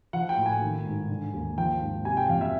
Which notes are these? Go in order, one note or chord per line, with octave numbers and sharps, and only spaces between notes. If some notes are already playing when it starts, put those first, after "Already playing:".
F3 F#5
G5
A2
G#5
D#3
G#2
D3
D#2
F3 G5
G#2
C3 G#5
G5
F2 F5
E5